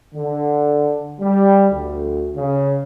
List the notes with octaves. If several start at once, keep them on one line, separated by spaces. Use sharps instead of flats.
D3
G3
D2
C#3